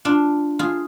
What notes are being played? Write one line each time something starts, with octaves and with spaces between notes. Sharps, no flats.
D4 F4
F4 G#4